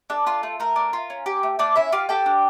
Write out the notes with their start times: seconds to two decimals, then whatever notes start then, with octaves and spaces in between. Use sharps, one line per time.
0.10 D4 A4
0.27 F4
0.43 A3
0.60 A3 A#4
0.76 D4
0.93 F4
1.10 C#4
1.26 G4
1.43 A3
1.59 A3 D4 D5
1.76 C#4 E4 E5
1.92 F4 G4 F5
2.09 G4 A4 G5
2.26 D4